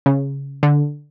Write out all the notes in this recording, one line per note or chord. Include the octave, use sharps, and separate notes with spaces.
C#3
D3